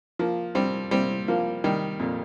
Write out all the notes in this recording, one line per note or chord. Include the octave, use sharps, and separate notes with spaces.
F3 A#3
G3 C4
G3 C4
F3 A#3
D#3 G3
F2 A#2